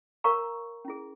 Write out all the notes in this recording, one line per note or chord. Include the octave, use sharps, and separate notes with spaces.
A#4 C#5 F5 A#5 C#6
C#4 E4 G#4